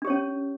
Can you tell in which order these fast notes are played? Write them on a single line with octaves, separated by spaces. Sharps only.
D4 G4 C#5 C#4